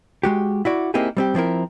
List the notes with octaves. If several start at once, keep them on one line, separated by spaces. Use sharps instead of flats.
G#3 F#4 G4
E4 F#4 D5
A#3 C4 D#4 E4 G4 G#4
G3 C4 G4
F3 C4 E4 A#4